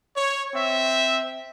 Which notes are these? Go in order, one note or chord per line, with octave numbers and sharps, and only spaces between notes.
C#5
C4 E5